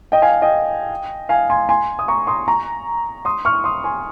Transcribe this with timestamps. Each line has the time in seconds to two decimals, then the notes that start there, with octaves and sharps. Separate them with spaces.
0.12 D#5 G5
0.22 F5 G#5
0.42 D#5 G5
1.29 F5 G#5
1.50 G#5 C6
1.69 G#5 C6
1.99 D#6
2.08 A#5 C#6
2.27 C6 D#6
2.48 A#5 C#6
3.25 C6 D#6
3.45 C#6 F6
3.64 C6 D#6
3.84 G#5 C6